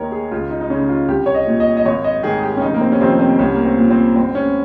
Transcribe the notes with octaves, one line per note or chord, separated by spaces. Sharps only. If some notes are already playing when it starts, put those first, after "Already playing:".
Already playing: D#2 D#3 A#4 C#5
G#4
C#2 F4
D#4
D#4
C#3 C#4
F4
C2 G4
C#5
D#5
A#2
D#5
D#5
G#1 C#5
D#5
G#2 D#3 G#4
G4
C#4
F1 D#4
A#3
C4
C#4
F2 C3 D#3 C4
C4
C2 C#4
A#3
C4
A#2
C4
G1 C4
C#4